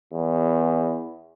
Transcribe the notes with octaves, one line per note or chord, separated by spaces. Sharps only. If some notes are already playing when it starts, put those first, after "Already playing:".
E2